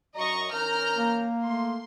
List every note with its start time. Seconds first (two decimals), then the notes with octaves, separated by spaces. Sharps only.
0.16 F#2 D#5 A#5 C#6
0.52 E3 C#4 A#4 A#5 F6 G6
0.97 A#3
1.44 A3 C6